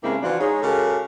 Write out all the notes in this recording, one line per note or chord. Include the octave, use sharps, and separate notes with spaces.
G2 C#3 G#3 A#3 C4 E4
E3 F3 D4 F4 F#4
G#3 D#4 C#5
C#3 G#3 F#4 G4 A4 A#4